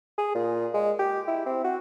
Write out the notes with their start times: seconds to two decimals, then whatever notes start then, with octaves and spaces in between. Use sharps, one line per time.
0.18 G#4
0.35 A#2
0.74 G#3
0.99 G4
1.27 E4
1.46 C4
1.65 F#4